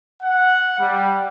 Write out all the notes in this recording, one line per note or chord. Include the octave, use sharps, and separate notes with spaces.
F#5
G3